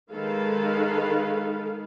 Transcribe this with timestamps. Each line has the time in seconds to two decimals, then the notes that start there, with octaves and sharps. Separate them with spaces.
0.11 D#3 G#3 A4 B4 F5